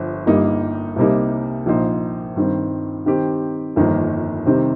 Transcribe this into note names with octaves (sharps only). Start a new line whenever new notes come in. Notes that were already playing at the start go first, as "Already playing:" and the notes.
Already playing: G1 G2 F3
G1 G2 G3 A#3 D#4
C2 C3 G3 A#3 D#4
A#1 A#2 F3 D#4 C5
G2 D#3 C4
D#3 C4 G4
G1 F2 D#3 A#3 D#4
C3 D#3 G3 C4